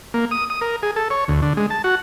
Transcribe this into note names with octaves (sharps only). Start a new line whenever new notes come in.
A#3
D#6
D#6
A#4
G#4
A4
C#5
D2
D3
G#3
A5
F#4